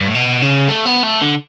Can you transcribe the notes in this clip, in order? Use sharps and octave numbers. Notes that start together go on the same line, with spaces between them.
G2
A2
B2
C#3
A3
B3
A3
D3